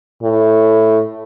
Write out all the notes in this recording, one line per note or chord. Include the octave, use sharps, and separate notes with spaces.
A2